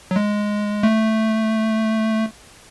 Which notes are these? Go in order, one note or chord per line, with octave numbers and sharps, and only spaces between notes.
F#3
G#3
A3